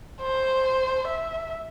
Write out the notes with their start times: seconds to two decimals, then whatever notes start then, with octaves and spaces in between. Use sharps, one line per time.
0.21 C5
1.07 E5